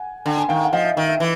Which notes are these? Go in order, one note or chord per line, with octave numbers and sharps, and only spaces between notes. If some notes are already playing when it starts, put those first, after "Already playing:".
Already playing: F#5 G#5
D3 G5
G#5
D#3 F5 G5
F#5
F3 D#5 F5
E5
D#3 E5
E5
E3